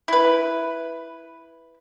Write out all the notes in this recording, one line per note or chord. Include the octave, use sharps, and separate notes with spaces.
E4 B4